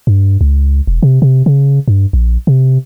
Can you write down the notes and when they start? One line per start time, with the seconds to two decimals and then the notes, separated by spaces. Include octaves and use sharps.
0.07 G2
0.41 C#2
0.87 E1
1.03 C3
1.22 C3
1.46 C#3
1.88 G2
2.13 A#1
2.47 C3